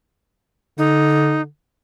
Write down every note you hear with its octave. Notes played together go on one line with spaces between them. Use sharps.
D3 D#4